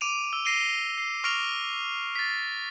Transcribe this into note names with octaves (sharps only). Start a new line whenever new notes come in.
D6 D7 D#7 F7
E6
A#6 C7 D7 D#7 G7
C7
C#6 F6 A#6 D7 F7 G7
A6 B6